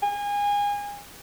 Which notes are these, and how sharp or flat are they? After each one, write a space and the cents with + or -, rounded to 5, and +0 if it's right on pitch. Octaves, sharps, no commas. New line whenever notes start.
G#5 -30